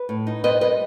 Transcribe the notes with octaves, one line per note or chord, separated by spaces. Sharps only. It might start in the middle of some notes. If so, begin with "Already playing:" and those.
Already playing: B4
A2
D#4
C4 B4 D#5
G3 B4 D#5